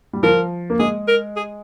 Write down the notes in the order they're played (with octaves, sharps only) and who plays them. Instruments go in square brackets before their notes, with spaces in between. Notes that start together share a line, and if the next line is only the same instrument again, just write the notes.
[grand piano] G3
[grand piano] F3 [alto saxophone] A#4
[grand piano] A#3
[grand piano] G#3 [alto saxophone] G#4
[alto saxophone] A#4
G#4